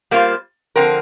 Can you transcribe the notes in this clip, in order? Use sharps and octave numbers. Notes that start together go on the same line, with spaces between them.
G3 A#3 F4 C5
D3 F3 C4 A#4